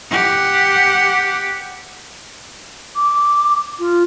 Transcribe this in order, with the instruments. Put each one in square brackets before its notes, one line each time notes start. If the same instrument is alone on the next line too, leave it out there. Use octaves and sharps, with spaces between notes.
[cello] G4 F#5
[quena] D6
F4